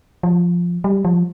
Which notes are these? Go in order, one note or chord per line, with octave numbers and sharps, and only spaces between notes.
F3
G3
F3